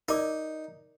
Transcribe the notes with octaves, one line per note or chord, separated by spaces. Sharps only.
D#4 A#4 D5 D6